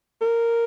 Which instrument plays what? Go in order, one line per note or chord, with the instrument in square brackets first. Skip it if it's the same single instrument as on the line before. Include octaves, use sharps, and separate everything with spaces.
[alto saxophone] A#4